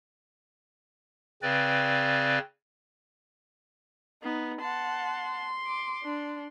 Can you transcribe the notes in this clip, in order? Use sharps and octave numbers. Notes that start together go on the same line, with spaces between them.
C#3 C4 B4 D5
B3 D#4
F#5 A5 C6
D6
D4